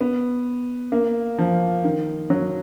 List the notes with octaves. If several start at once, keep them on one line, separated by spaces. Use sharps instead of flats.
B3
A#3
F3
D#3
F#3